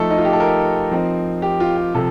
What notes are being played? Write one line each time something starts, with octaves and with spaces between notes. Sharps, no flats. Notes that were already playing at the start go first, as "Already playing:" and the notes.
Already playing: F3 A3 D#4 A4
D#4
F4
G4
A4
A#4
F3 C4 D#4
G4
F4
G4
C3 F3 A4